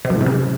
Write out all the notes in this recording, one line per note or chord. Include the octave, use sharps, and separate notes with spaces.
C3
F#2
A2
C3
C#3